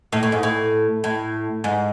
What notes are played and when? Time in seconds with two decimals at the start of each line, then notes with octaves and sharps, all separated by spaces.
0.12 A2
0.23 A2
0.32 G#2
0.43 A2
1.04 A2
1.64 G#2